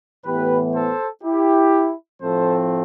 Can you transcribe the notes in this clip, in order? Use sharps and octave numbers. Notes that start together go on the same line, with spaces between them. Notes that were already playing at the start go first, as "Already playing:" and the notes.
A2 E3 B3 G4 B4
A4 C5
E4 G4
A2 F3 A3 C4 A4 C5